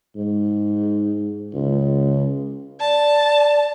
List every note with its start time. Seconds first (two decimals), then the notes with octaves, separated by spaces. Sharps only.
0.16 G#2
1.54 C#2
2.80 D5 A5